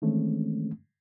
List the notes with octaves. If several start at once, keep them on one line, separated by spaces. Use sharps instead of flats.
D#3 E3 G#3 A3 C4 C#4